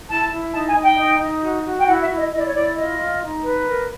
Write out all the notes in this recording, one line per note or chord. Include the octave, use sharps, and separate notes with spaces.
E4 A5
E4
D#4 A5
G#5
D#4
G5
D#4
D#4
F#4
F#4
G5
E4 F#5
E5
E4
D#5
E4 D#5
D5
C#5
E4 D5
F4 D#5
F4
D#4
B4
A#4